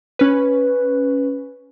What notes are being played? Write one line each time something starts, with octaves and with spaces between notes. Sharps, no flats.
C#4 B4